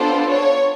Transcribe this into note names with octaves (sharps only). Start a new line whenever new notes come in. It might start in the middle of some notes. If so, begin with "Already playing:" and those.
Already playing: B3 D4 F4 A4 C5
C#5